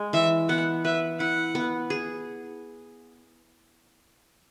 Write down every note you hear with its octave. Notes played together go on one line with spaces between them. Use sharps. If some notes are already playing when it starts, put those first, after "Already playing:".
Already playing: G#3
E3 E5
B3 F#5
B4 E5
E4 F#5
B3
G#4